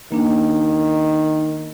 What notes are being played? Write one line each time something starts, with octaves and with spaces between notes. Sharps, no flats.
D#3 A#3 D4